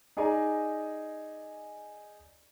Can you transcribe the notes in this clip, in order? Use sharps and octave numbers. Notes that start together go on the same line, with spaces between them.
D#4 G#4 D5 G#5 A#5